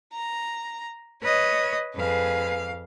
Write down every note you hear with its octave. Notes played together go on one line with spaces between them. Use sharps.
A#5
B4 C#5 D#5
F2 G#4 B4 F5